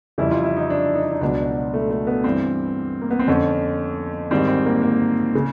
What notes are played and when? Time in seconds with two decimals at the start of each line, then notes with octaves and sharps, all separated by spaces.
0.18 F2 C#3 E3 G3 E4
0.31 F4
0.44 E4
0.57 D#4
0.70 D4
0.95 D#4
1.03 D4
1.11 D#4
1.21 C#2 B2 F#3 D4
1.74 A3
1.91 A3
2.07 B3
2.24 G2 E3 G3 C4
3.01 A#3
3.10 B3
3.19 C4
3.28 F2 D3 F3 C#4
4.31 G#2 D#3 G3 C4
4.47 C4
4.66 A#3
4.82 A#3
5.35 C#3